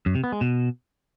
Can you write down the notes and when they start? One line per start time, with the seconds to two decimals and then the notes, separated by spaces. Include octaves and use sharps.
0.06 F#2
0.15 C3
0.24 B3
0.32 G#3
0.41 B2